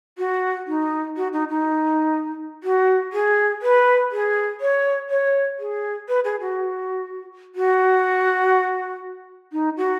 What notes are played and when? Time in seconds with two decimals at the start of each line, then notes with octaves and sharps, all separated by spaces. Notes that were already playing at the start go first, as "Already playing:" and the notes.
0.18 F#4
0.67 D#4
1.17 F#4
1.33 D#4
1.50 D#4
2.64 F#4
3.13 G#4
3.62 B4
4.12 G#4
4.61 C#5
5.10 C#5
5.59 G#4
6.08 B4
6.24 G#4
6.41 F#4
7.55 F#4
9.52 D#4
9.77 F#4